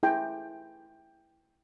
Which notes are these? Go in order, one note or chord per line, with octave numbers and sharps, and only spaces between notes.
E4 G#4 G5